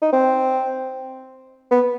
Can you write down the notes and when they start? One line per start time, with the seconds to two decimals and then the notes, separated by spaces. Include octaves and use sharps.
0.02 D#4
0.13 C4
1.71 B3